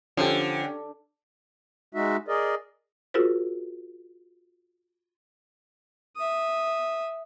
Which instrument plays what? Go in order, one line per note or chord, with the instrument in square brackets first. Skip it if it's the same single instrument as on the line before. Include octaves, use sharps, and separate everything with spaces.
[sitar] D3 [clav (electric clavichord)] F3 [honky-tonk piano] C#4 G4
[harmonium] G#3 D#4 F#4 E5
G#4 A#4 D5 D#5
[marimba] F4 F#4 G#4 A#4 C5
[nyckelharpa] E5 D#6